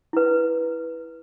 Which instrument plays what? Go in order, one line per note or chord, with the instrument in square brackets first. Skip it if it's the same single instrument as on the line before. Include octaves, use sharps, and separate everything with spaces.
[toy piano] E4 B4